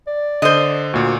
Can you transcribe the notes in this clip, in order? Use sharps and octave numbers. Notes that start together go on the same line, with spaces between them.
D5
D3 C5 D#5
D2 A#2 F#4